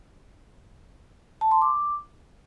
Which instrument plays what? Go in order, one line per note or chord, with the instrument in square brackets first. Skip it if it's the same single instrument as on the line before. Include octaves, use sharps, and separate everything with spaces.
[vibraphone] A5
C6
D6